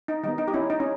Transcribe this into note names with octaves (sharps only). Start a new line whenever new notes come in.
D#4
D#3 G3 B3 D#4
D#4
G4
C#4 E4
D#4
C#4